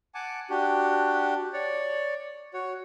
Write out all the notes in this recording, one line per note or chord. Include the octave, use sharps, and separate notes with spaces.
F#5 G#5 A5 D6
D4 F#4 G4
C#5 D5
F#4 C#5